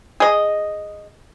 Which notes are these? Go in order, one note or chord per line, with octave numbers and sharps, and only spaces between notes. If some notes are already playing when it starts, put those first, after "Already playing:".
G#4 D#5